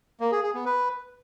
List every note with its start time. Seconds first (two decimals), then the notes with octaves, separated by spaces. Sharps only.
0.20 A#3
0.32 G#4
0.43 G#4
0.54 B3
0.65 B4